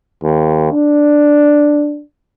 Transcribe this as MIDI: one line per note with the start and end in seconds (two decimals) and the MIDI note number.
0.24 0.70 39
0.72 2.02 62